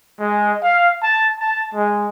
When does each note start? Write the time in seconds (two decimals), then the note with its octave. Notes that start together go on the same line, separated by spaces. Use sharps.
0.20 G#3
0.63 F5
1.03 A5
1.40 A5
1.74 G#3